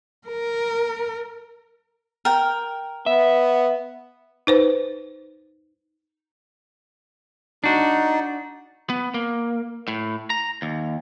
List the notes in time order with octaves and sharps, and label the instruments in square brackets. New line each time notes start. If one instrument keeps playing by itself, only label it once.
[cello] A#4
[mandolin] A#4 G5
[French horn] B3 [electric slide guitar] E5
[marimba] D#4 B4 C5
[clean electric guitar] D4 F#4 [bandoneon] D#4
[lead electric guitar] B3
A#3
A2
A#5
D#2